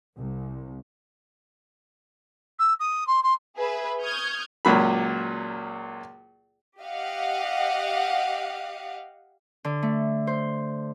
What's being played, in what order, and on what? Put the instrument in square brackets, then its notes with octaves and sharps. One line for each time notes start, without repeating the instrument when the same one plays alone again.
[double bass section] C2
[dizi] E6
D#6
C6
C6
[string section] G#4 B4 E5
C#6 D#6 F6 G6 G#6
[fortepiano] C#2 A#2 F#3 B5
[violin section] G4 D#5 F5 F#5
[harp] D3
A3
C5